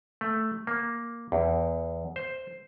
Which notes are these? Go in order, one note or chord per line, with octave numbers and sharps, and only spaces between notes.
A3
A#3
E2
C5